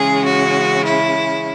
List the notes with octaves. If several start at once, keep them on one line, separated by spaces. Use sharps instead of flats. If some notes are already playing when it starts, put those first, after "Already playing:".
Already playing: C#3 E3 G#3 C#4 G#4
F#4
E4